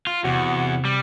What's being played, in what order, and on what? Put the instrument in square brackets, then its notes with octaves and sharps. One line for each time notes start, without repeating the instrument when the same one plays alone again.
[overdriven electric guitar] F4
[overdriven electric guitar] E2 [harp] C3 [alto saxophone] F#4
[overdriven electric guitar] G3